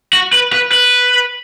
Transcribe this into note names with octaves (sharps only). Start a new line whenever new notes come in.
F#4
B4
B4
B4